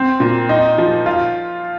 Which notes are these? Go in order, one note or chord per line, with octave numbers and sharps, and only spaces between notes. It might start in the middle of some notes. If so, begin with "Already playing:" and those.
Already playing: C4
A#2
D#4
F3
F4